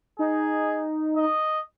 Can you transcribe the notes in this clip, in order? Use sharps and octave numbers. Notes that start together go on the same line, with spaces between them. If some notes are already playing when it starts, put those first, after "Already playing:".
D#4 G#4
D#5